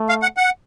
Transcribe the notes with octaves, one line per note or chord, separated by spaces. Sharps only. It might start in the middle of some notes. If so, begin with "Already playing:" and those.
Already playing: A3
F5
F#5
F#5